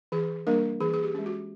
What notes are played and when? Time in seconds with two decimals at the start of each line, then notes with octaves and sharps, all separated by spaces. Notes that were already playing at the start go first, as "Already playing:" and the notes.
0.12 E3 G#4
0.47 G3 A#3 D4 A#4
0.80 E3 G#4
0.94 G#4
1.03 G4
1.14 G#3 C#4
1.26 F#4